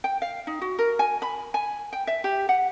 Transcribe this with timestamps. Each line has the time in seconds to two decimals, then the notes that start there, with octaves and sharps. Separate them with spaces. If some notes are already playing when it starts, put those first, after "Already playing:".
0.04 G5
0.22 F5
0.47 D#4
0.61 F#4
0.79 A#4
0.99 G#5
1.22 B5
1.54 G#5
1.93 G5
2.07 E5
2.24 G4
2.49 F#5